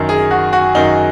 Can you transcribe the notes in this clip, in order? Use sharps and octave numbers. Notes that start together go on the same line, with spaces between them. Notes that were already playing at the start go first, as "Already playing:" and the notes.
Already playing: F#2 D#3
G#4
F#4
F#4
F#2 D#3 D#4